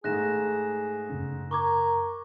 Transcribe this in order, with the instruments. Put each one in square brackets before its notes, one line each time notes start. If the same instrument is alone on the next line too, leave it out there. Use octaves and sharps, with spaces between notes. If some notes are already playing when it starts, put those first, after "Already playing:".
[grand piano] G#2 A3 [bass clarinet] G#4 [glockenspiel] F#6 A#6 E7
[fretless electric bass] F#2 C#3 C#4
[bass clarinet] A#4 [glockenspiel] C#6 D6 G#6